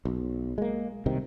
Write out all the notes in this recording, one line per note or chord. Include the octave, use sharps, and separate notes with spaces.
B1
G#3 A#3
C2 C3 D#3